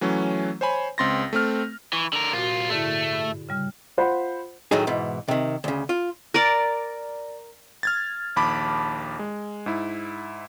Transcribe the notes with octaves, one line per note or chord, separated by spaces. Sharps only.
E3 F#3 A3 C#4
C5 C#5 G#5 B5
C#2 C4 C6 A6 A#6
A3 C4 F6
E3 C#6
D3 A#4
C2 A#2 F4 F#4
G#2 D3 A3 E4
G2
C#3 G3 F6
F4 C5 F#5 B5
A2 D#3 F#3 A3 D#4 G#4
G#2 B2 E3
C3 D#3
D2 C#3
F4
A#4 D5
F6 G#6 A6
A#1 D#2 A5 B5 D6
G#3
G#2 E4